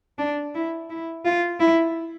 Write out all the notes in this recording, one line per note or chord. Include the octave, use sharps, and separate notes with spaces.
D4
E4
E4
F4
E4